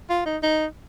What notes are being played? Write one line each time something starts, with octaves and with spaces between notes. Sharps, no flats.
F4
D#4
D#4